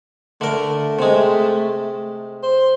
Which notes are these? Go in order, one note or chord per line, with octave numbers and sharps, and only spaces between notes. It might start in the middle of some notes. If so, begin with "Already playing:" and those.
D3 A3 A#4
C3 G#3
C5